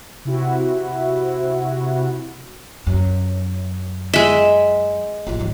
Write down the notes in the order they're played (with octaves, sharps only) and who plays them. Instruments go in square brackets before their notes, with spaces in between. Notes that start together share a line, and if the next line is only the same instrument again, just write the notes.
[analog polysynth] C3 E4 F#4
[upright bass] F#2
[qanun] G#3 E5
[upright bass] A1 F4
G#1 G3